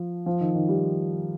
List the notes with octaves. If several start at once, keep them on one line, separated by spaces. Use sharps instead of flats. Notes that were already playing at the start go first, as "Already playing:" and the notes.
Already playing: F3
F3
D#3
D#3
G3